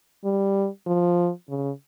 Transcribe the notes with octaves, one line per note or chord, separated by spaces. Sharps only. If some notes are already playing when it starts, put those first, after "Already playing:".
G3
F3
C#3